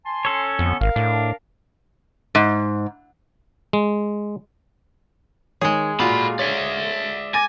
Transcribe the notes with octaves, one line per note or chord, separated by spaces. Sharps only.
G#5 A5 C6
C#4 A4 C#5
F2 D3 B3
G#1 A#4 F5
A2 D4
G#2
G#3
D#3 G#3 G#4 C#5
A#2 F4 F#4 A4 B5
C#5 D5 E5
G#5 D6 A6 A#6